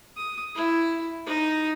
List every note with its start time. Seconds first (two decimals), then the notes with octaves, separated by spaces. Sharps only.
0.16 D#6
0.55 E4
1.26 D#4